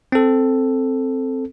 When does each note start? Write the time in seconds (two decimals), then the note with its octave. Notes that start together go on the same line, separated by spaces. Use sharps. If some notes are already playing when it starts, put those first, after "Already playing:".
0.12 C4 A4